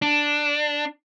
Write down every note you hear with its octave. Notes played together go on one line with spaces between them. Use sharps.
D4